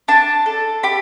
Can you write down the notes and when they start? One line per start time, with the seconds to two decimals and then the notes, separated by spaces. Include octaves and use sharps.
0.08 D4 A5
0.46 A4
0.83 G4 B5